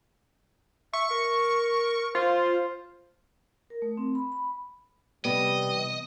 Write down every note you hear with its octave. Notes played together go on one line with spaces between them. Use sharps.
E5 C#6
A#4
F4 C5
A#4
A3
C4
B5
B5
C3 E3 G3 B3 D#5